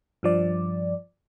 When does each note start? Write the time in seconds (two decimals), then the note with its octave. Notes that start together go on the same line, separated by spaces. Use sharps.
0.23 G2 F3 D5